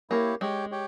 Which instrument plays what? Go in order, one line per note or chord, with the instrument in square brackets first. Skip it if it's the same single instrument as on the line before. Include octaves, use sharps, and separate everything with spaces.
[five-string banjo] A#3 [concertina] E4 G4 C#5
[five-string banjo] G#3 [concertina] G4 C#5 G5
[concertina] G4 C#5 G5